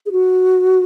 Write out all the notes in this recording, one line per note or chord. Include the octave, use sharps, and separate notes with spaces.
G#4
F#4